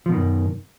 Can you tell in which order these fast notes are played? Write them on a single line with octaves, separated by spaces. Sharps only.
F3 B2 D#3 F#2